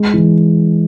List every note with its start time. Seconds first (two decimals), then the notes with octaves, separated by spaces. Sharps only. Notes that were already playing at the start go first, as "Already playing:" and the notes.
Already playing: G#3
0.13 E3